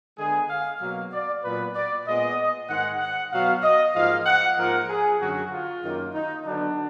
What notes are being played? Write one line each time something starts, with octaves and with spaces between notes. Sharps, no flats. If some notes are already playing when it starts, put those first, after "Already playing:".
D3 G#3 B3 G#4
F5
B2 F#3 A#3 F5
D5
A#2 F#3 B3 B4
D5
A#2 G#3 B3 D#5
G#2 D#3 G#3 F#5
F#5
B2 F#3 B3 F5
D#5
G#2 F3 A#3 F5
F#5
G#2 F3 A#3 A#4
G#4
F#2 D3 F#3 F#4
F4
F#2 D#3 A#3
D#4
D3 F#3 B3 D4